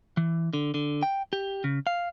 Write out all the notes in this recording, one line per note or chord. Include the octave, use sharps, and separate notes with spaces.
E3
D3
D3
G5
G4
C#3
F5